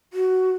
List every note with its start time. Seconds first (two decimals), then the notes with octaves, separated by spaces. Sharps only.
0.13 F#4